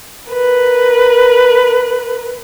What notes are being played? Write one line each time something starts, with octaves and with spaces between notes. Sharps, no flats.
A#4 B4